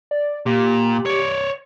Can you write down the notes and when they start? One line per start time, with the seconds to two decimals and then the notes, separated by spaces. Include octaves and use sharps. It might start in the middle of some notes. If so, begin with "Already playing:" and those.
0.11 D5
0.46 A#2 G4
1.06 C#5 D5